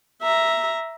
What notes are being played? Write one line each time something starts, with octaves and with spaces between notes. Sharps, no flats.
E5 A#5